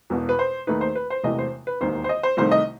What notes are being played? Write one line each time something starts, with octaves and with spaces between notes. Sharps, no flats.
E1 E2 B2
B4
C5
D#2 D#3 A3 D#4 B4
C5
B4
C5
E1 E2 C3 E3 A3 D#5
C5
B4
E1 D#2 D#3 C5
C5
D#5
C5
C2 C3 D#3 A3 D#4 C5
D#5